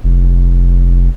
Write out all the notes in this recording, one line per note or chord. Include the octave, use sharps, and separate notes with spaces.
F1